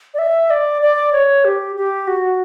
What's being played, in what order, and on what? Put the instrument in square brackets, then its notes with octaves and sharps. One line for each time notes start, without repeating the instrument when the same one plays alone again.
[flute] D5
E5
D5
D5
C#5
G4
G4
F#4